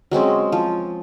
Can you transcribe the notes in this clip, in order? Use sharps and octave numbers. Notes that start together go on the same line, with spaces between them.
F#3 G#3 C4 C#4
F3